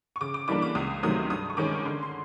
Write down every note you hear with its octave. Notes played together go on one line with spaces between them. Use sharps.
C#6
C#3 D6
D6
E3 G3 A#3 D4 D6
D6
C#2 D#6
C3 D#3 F#3 A3 D#6
G2 D#6
C#6
D#3 G#3 C#4 D6
D3 C6
C6